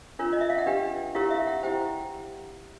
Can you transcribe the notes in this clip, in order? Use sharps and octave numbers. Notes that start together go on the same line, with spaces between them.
D4 F4 A#4 C#5
D#5
E5
F5
F#5
D4 G4 B4 G5
E4 G4 A#4 C#5 F5
E5
F#5
E4 G4 C5 G5